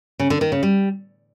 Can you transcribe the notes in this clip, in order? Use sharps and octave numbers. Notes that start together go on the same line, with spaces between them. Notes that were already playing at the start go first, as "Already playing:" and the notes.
C#3
D3
D#3
C#3
G3